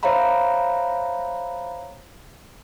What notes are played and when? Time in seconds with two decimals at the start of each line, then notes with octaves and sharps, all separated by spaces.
0.03 C5 C#5 E5 F5 A#5 B5